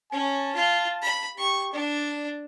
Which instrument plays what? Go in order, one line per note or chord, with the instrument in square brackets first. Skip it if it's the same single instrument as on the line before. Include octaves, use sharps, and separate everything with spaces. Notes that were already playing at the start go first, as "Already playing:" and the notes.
[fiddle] C#4 [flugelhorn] A5
[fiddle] F4
B5
[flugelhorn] G4 [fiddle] C#6
[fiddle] D4 [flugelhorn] D5